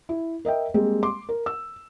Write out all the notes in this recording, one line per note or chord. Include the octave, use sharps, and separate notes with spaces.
E4
A#4 D#5 E5 G5
G3 G#3 A#3 C4 G#4
C6 D6
A#4
E6